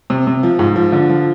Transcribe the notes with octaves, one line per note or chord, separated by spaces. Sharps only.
C3
C3
F3
G#2
F3
D3
F3